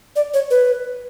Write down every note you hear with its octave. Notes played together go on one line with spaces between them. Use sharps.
D5
C#5
B4